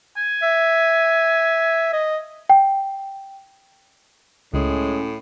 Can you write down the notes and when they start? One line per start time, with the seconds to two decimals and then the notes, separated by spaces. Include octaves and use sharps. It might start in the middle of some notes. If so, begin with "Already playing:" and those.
0.17 G#5
0.43 E5
1.93 D#5
2.50 G5
4.54 C#2 A2 G#3 C#4